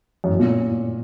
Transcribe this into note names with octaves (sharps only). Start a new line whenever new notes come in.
F#2
A2
A#2